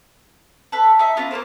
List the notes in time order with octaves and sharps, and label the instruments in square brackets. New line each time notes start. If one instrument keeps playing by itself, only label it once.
[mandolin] A4 B4
D#4 E5
B3 C#4 F4 A#5
A#3 C4 A#4 C5